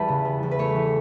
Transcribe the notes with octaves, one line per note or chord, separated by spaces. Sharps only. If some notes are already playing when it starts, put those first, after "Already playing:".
Already playing: E2 G3 B4 G5 A5
C#3
B3
E2
B4
A3 C#5
E3